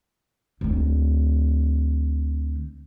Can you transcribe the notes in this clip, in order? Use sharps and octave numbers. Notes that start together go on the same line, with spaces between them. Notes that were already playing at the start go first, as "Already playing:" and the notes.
D2 C4